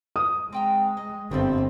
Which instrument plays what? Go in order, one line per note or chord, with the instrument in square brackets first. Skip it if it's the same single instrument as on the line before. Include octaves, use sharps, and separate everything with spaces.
[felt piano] D#6
[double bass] G#3 [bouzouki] C4 G5 A#5
[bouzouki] D#5
[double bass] G1 C4 [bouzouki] A2 F3 G3